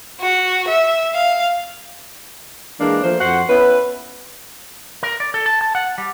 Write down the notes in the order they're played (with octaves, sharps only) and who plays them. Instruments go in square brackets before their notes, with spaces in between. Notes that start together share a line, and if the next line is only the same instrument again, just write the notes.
[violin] F#4
E5
F5
[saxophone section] E3 G#3 A#3 D4
F3 A3 A#3 C5
F2 F#4 C5 F#5
B3 C#4 E4 B4
[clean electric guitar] A#4
D5
A4
A5
A5
F#5
G3